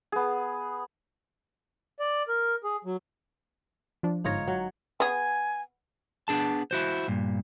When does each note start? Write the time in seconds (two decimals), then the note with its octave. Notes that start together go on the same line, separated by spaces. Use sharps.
0.12 B3 G#4
2.00 D5
2.28 A#4
2.64 G#4
2.85 F#3
4.03 F3 D4
4.24 G1 G#2 D#4 F4 C#5 A#6
4.48 F#3
5.00 B3 G#4 G#5
6.28 B3 D4 G#4 A5
6.71 E4 F#4 C5
7.08 G2 A#2